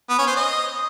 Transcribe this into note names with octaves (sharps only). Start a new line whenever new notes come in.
B3
C#4
C5
D#5